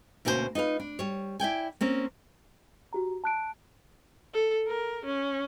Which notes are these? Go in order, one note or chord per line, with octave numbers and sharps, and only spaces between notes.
D2 B2 A#3 C#4 G#4 C5
D#4 F4 B4 F5
D4
G3 C#5
E4 D5 G5 G#5
A#3 C4 C#4
F#4 G4 A#5
A5 F#6 D7
A4
A#4
C#4